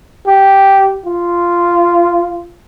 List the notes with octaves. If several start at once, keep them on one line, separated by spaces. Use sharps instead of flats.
G4
F4